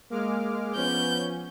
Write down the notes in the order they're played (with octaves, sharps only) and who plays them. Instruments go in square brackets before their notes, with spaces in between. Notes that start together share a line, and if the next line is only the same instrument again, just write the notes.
[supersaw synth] G#3 D6 F6 [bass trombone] A#3
[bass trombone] F3 [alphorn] B3 [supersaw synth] C#4 [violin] G6